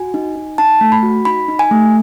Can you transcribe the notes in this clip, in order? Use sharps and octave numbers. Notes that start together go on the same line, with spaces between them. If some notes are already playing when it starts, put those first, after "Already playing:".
Already playing: F#4 G#5
D#4
D#4
D#4 A5
A3
B5
F#4
D#4 B5
D#4
G#5
A3